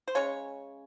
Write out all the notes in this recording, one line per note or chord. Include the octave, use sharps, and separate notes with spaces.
C5
C#3 G#3 C#4 C#5